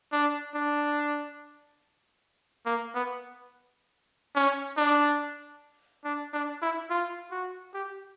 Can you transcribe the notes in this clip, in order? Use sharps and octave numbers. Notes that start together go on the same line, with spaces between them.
D4
D4
A#3
B3
C#4
D4
D4
D4
E4
F4
F#4
G4